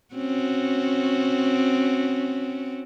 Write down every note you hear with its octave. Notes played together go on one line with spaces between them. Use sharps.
C4 C#4 F#4